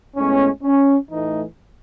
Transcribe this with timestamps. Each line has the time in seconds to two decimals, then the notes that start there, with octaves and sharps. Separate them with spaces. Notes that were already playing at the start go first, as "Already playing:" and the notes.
0.16 A2 G#3 B3 C#4
0.63 C#4
1.10 A2 E3 A3 D#4